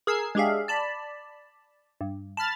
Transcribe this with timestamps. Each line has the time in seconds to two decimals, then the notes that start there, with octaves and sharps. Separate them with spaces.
0.07 G#4 A#4 E6 G#6 C7
0.35 G#3 D4 G4 G#4 E5 F5
0.68 D5 A5 B5
2.01 G2
2.37 A5 B5 F6 A6